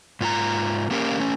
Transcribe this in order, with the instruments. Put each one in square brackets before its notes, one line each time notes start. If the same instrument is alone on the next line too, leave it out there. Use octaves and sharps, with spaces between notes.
[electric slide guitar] G#2 F4 G4 A#5
A#3 C#4 G4 A#4 F5
A3 C#4